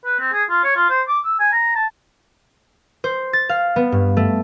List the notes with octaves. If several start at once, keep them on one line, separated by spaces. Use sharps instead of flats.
B4
C4
G#4
F4
C#5
F4
C5
D6
E6
G#5
A#5
A5
C5
A6
F5
B3
G2
A3